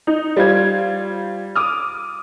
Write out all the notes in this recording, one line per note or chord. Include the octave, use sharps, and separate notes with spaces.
D#4
G3 F4 C5 G#6
D6 D#6 F6